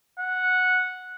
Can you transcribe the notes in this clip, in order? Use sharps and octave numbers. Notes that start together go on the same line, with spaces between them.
F#5